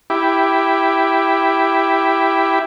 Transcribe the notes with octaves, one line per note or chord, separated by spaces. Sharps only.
E4 G4